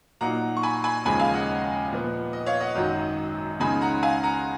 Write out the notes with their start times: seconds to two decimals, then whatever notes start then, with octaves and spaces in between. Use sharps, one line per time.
0.21 A#2 F#3 A#3 D#4 F#5 A#5
0.57 C#6
0.63 G#5 B5
0.84 G#5 B5
1.05 D#2 C#3 F3 G#3 G#5 B5
1.20 F5 G#5
1.34 D#5 F#5
1.91 A#2 F3 B3
2.33 D#5
2.46 C#5 F5
2.61 D#5 F#5
2.75 G#1 F#2 D#3 F#3
3.60 C#2 C#3 G#3 D#4 G#5 B5
3.81 F#5 A#5
4.03 F5 G#5
4.23 F#5 A#5